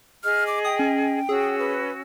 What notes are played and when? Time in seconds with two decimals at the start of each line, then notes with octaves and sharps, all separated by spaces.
0.24 G#4 D#5 F6
0.47 D6
0.65 G5 D#6
0.79 C#4
1.29 C#4 F#4 G#4 E6
1.59 B4